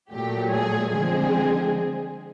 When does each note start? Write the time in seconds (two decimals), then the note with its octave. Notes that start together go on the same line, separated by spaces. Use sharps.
0.11 A#2 F#3 A3 G4
0.51 G#4
0.92 D3 F3 G#3 C4 G#4